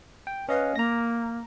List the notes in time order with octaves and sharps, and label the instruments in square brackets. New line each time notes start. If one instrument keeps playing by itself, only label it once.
[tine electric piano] G5
[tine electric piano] C#4 D#5 F5 [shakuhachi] B4
[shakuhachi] A#3 [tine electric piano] A#5 A#6